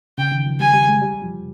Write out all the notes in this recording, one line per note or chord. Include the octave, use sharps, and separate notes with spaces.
C#3 G5
D#3
F3
G3 G#5
G3
G#3
G3
F3